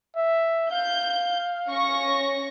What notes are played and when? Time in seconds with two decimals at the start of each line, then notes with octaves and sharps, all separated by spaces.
0.17 E5
0.72 F5 G6
1.69 C#4 C#6 A#6